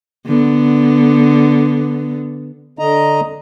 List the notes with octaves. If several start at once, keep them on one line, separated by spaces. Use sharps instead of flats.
D3 B3
D3 D#5 A#5